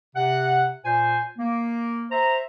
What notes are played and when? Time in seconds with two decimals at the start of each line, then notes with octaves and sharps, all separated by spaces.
0.16 C3 F#5
0.85 A#2 C5 G#5
1.38 A#3
2.12 C5 E5 A#5